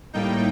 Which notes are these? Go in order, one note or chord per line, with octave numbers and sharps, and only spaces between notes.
A2 G3 A#3 D#4 G5